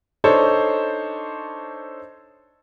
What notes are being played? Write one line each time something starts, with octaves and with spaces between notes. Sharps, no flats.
D4 D#4 A4 C5 C#5